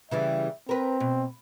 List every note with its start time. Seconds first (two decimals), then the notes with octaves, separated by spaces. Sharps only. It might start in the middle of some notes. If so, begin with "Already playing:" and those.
0.11 C#3 E3 G3 E5
0.69 C4 A#4 B4
1.00 B2